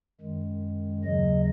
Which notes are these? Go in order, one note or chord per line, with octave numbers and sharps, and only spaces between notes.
F#2 D#3 G#3
D#2 C#3 F#3 D#5